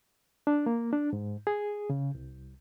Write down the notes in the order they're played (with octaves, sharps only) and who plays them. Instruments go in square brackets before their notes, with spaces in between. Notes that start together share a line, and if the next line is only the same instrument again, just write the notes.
[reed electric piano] D4
A#3
D4
G#2
G#4
C#3
C2